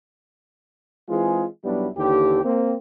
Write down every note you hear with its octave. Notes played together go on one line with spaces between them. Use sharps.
E3 G#3 C4 F4 G#4
B1 F#3 G3 B3 D4 E4
D#2 D3 E3 G4
A#3 C4